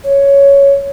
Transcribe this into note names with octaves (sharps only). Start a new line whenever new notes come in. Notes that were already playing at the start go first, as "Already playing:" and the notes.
C#5